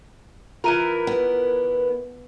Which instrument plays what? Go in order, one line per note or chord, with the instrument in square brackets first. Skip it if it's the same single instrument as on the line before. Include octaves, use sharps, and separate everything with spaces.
[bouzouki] E3 E4 A#4 [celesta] F4 A#5 D#7
[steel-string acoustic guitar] B3